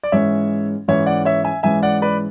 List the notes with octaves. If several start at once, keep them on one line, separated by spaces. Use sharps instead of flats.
D5
G#2 E3 G#3 C#4 C#5 E5
G#2 E3 G#3 C#4 C#5 E5
D5 F#5
C#5 E5
E5 G#5
G#2 E3 G#3 C#4 E5 G#5
D5 F#5
B4 D5